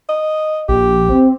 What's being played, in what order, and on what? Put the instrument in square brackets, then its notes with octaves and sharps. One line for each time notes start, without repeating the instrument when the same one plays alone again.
[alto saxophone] D#5
[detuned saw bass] A#1 [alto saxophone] G4
[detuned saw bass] C4